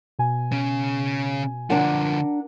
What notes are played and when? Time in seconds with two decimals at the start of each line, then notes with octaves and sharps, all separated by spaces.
0.19 B2 G#5
0.52 C#3 C#4
1.70 D3 F3 D4 A#4 F#5